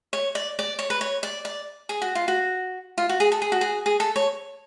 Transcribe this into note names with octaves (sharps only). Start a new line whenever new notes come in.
C#5
D5
D5
C#5
B4
C#5
D5
D5
G#4
F#4
F4
F#4
F4
F#4
G#4
A4
G#4
F#4
G#4
G#4
A4
C#5